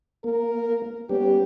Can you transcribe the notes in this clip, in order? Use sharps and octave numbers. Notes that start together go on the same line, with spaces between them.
A#3 A#4
G3 B3 C#4 G4